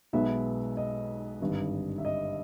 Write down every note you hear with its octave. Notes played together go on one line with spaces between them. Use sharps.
B1 B2 G#3 B3 E5
D#5
G#1 G2 D3
E5
D#5